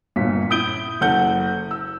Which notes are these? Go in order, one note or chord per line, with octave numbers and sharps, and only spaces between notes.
G1 A#2 B6
E4 D#6 G6 D7 G7
F#1 A4 F#5 G6 G7
E6